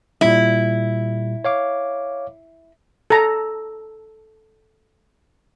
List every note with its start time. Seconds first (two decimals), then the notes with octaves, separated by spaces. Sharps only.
0.21 A#2 G3 E4
1.45 C#5 F5 D6
3.10 A4 A#5